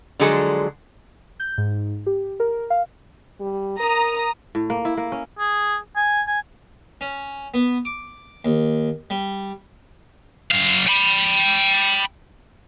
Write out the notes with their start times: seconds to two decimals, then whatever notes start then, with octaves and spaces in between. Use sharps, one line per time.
0.20 D3 F3 F#3 G#3 G#4 A4
1.40 G6
1.58 G#2
2.06 G4
2.40 A#4
2.70 F5
3.40 G3
3.80 A#4 A#5 D#6
4.55 A2
4.70 A#3
4.85 E4
4.97 A#3
5.12 C#4
5.39 G#4
5.96 G#5
6.27 G#5
7.01 C#4
7.54 B3
7.85 D6
8.45 D#2
9.10 G3
10.52 F#2 F5
10.88 G5 B5